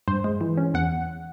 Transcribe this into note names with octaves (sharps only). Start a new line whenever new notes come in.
G2 C5
G#3
E3
C#4
E2 F#5